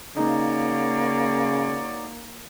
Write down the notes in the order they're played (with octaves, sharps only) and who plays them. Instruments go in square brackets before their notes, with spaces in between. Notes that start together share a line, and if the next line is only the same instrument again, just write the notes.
[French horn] C#3 [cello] A#3 [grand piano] D#4 [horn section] F#4 C#5 D5